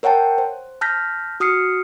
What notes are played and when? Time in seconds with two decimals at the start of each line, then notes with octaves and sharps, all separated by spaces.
0.03 A#4 C#5 F#5 G5 A5
0.38 C5
0.81 A5 F6 G6 A#6 B6
1.40 F#4 D#6 F6 C7 C#7